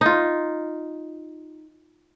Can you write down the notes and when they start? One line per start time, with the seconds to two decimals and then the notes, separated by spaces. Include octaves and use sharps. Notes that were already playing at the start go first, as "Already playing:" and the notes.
0.01 D#4 F4